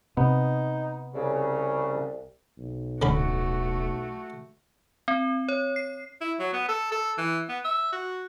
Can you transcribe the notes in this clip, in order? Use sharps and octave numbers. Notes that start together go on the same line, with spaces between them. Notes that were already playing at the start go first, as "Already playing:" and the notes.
C3 B3 D#4
C2 C#3
B1
D1 D3 A3 C#4 F#4 B5
C4
C#5
C7
E4
F#3
B3
A4
A4
E3
B3
E5
F#4